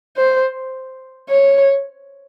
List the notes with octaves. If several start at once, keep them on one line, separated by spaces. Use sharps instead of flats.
C5
C#5